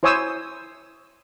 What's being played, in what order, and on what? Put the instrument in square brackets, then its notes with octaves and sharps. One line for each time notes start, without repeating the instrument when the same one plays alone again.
[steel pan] E4 C5 C#5 G#5 D#6 E6